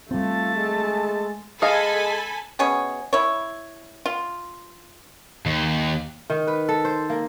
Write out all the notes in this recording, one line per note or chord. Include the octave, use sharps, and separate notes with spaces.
G3 A3 C4 F4 A5
G#3
G#3 A4 D#5 F5 G#5 B5
B2 C#4 G#4 C#5
E4 C#5
F4
D#2
D#3
B4
A4
C5
A#3